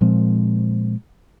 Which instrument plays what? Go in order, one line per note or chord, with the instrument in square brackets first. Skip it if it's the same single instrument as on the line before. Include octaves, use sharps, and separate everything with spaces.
[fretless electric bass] A#2 F3 G#3 C4